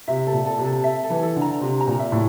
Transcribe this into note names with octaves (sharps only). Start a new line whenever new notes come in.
C3 E5
C3 A4
A#2
A4
C3
A4
E5
A4
E3
A4
D3
A#5
C3 F4
A#5
A#2
E5
A2